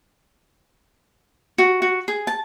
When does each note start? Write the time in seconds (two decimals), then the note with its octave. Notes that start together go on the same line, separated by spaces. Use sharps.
1.58 F#4
1.82 F#4
2.08 G#4
2.27 A5